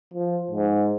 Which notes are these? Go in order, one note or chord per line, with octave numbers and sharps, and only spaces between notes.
F3
G#2